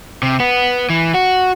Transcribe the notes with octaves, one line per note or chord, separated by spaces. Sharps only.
C3
B3
E3
F#4